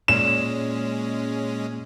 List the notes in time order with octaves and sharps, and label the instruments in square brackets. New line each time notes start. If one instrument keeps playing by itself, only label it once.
[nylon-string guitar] A#2 [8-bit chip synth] G#3 C#4 [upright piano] E7